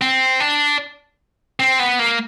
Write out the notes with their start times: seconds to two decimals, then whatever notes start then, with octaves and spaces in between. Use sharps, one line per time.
0.01 C4
0.40 D4
1.60 C4
1.80 B3
1.99 A#3